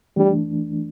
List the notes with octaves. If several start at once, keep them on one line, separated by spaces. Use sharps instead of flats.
E3 G3 A3 D4